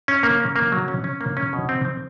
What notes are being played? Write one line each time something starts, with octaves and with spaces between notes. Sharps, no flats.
C#4
A#3
C#4
A#3
F#3
C#4
C#4
A#3
C#4
B2
C4
C4